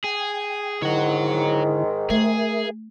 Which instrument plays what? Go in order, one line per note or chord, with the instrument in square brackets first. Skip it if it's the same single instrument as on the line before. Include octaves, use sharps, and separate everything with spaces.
[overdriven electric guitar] G#4 [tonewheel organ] G5
[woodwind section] G#2 D#3 [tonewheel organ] D3 E4 [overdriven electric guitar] C#5 F#5
[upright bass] A3 [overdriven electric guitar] G#4 [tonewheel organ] A#4 E5